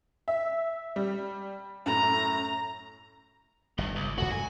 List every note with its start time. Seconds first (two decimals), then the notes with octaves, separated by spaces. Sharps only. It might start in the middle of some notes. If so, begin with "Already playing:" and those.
0.28 E5
0.96 G3
1.86 F#2 A2 A#5
3.78 G1 G2
3.96 C#2
4.18 F#2 C#3 A3 F#4
4.31 G#5